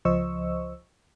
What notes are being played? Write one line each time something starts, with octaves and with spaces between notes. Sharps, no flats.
C#2 F3 C5 D#5 C#6 E6